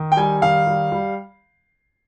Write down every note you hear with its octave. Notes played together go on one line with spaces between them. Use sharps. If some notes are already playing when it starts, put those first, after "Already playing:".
Already playing: D#3
G5
G3 G#5
D#3 F5
G3
G3